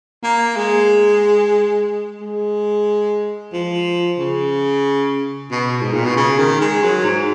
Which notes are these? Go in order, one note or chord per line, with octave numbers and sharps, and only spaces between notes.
A#3
G#3
G#3
F3
C#3
B2
G#2
A#2
B2
C#3
D#3
G#3
F#3
G#2